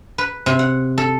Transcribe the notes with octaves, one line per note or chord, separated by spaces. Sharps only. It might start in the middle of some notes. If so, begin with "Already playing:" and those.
B4
C3
F#5
A4